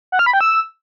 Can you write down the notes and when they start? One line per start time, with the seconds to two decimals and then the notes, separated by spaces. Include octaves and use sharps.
0.12 F#5
0.19 F6
0.26 B5
0.33 G5
0.41 E6